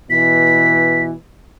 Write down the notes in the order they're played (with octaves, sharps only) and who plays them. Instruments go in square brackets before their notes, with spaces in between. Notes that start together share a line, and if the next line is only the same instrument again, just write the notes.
[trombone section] B2 E3 [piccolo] B6